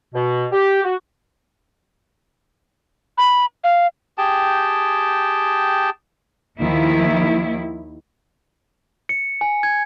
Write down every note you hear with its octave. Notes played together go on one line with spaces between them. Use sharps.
B2
G4
F#4
B5
F5
G4 G#4 G5 A5
D#2 D#3 F3 A#3 E4
C#7
G#5
G#6